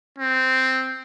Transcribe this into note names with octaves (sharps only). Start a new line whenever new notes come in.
C4